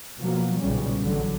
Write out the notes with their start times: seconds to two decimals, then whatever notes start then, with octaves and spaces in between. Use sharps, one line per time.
0.19 B2 F3 F#3 A#3
0.60 B1 A#2 C#3 G3 C#4
1.04 A1 D3 F#3